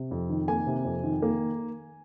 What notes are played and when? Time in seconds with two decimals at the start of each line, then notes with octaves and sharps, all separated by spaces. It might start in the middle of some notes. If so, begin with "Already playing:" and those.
Already playing: C3
0.11 F2
0.30 D#3
0.48 A#3 G#5
0.67 C3
0.85 F2
1.04 D#3
1.22 A#3